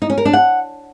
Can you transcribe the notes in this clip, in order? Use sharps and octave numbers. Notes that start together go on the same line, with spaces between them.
D#4
C#4
A#4
D4
F#5